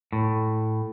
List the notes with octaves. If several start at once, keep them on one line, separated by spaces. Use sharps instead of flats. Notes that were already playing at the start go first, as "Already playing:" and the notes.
A2